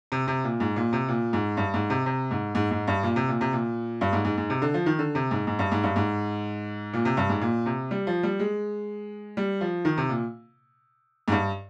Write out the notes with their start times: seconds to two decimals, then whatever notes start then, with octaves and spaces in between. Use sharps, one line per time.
0.12 C3
0.28 C3
0.44 A#2
0.60 G#2
0.76 A#2
0.93 C3
1.08 A#2
1.33 G#2
1.57 G2
1.74 G#2
1.90 C3
2.06 C3
2.31 G#2
2.55 G#2
2.71 G#2
2.87 G2
3.03 A#2
3.16 C3
3.28 A#2
3.41 C3
3.53 A#2
4.01 G2
4.13 G#2
4.25 G#2
4.38 G#2
4.50 C3
4.62 D3
4.74 F3
4.86 D#3
4.99 D3
5.15 C3
5.31 G#2
5.47 G#2
5.59 G2
5.72 G#2
5.83 G2
5.96 G#2
6.93 A#2
7.05 C3
7.17 G2
7.29 G#2
7.41 A#2
7.66 C3
7.91 G3
8.07 F3
8.23 G3
8.39 G#3
9.37 G3
9.61 F3
9.85 D#3
9.97 C3
10.09 A#2
11.28 G#2
11.32 G2